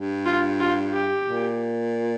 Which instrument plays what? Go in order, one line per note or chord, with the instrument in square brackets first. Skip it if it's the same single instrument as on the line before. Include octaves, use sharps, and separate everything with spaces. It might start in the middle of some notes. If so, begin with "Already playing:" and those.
Already playing: [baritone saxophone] G2
[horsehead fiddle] F4
F4
G4
[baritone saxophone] A#2